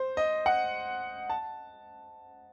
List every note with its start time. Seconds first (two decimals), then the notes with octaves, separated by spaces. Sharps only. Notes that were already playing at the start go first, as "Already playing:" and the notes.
Already playing: C5
0.17 D#5
0.46 F#5
1.30 A5